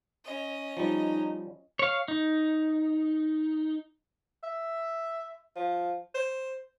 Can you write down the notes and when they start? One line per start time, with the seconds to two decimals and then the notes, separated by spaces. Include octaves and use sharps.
0.25 C#4 D#5
0.77 F3 G3 D#4
1.79 C#5 F5
2.08 D#4
4.43 E5
5.56 F3
6.14 C5